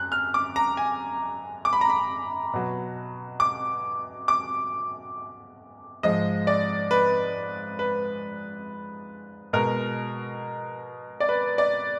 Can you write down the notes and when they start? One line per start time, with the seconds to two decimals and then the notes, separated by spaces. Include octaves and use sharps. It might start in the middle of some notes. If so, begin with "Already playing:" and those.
Already playing: F#2 F#6
0.12 F6
0.34 D6
0.56 A#5
0.77 G#5
1.65 D6
1.73 B5
1.81 A#5
1.90 B5
2.53 B2 F#3
3.40 D6
4.28 D6
6.03 G#2 F3 G#3 D#5
6.47 D5
6.91 B4
7.79 B4
9.53 B2 G#3 A#4
11.20 D5
11.29 B4
11.58 D5